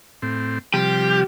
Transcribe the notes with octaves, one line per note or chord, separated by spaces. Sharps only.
A2 C4
C3 F3 G3 G4